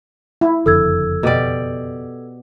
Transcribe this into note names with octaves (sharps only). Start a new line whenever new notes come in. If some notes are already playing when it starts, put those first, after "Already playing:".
E4
F#1 F2 D3 A4 E6 G#6
B2 G4 D5